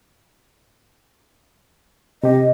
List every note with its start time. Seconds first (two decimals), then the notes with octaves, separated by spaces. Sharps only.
2.23 C3 G4 D#5